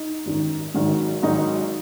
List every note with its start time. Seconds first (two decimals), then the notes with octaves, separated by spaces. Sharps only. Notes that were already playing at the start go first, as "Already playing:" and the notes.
Already playing: D#4
0.26 G#1 F#2 D#3
0.74 G#1 G#2 D#3 F#3
1.22 G#1 G#2 D#3 F#3 D#4